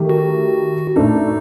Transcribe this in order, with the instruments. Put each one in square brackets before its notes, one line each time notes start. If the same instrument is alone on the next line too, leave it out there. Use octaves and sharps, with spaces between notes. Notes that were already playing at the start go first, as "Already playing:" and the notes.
Already playing: [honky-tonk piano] D#3 A3 G4 A#4
[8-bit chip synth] F#4
[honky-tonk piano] A2 A3 D4 A4 [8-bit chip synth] D#4